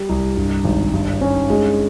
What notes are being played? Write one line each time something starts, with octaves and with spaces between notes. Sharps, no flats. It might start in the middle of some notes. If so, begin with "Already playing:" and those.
Already playing: G3
C2
G2
G#1
G2
C#4
G#3